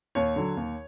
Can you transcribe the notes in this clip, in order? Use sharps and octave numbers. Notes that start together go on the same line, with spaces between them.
D#2 C#5
D3 F#3
D#2